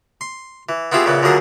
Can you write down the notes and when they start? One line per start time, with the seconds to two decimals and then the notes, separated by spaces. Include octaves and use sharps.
0.21 C6
0.69 E3
0.92 B3 C4 E4 F4 G4 G#4
1.06 A#1 C#3 E3 B3
1.23 D2 D3 F3 F#3 G#4 A#4